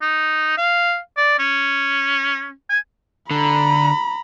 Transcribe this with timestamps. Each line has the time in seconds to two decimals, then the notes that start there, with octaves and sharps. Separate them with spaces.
0.02 D#4
0.57 F5
1.17 D5
1.39 C#4
2.70 G#5
3.31 D3 A#5 B5